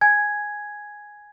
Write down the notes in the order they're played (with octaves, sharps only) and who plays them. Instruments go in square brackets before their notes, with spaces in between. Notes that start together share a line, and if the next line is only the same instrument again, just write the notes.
[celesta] G#5 G#6